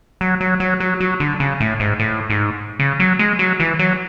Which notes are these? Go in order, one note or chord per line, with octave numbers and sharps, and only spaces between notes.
F#3
F#3
F#3
F#3
F#3
D3
C#3
A2
G#2
A2
G#2
C#3
F#3
G#3
F#3
E3
F#3